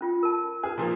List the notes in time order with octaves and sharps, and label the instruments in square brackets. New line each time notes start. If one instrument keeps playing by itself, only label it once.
[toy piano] C#4 F4 G5
A#4 A5
[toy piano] C#4 B4 [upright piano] G#4
[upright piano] A#2 F3 A#3